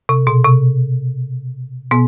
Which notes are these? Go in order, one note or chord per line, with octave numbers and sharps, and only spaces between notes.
C3
B2
C3
B2 B3